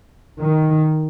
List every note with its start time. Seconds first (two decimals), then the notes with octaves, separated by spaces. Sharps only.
0.39 D#3